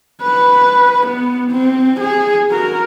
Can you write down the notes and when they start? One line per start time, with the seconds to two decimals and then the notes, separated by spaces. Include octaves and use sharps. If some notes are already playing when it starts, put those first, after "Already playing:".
0.22 B4
1.07 B3
1.51 C4
2.00 G#4
2.50 F#4 A#4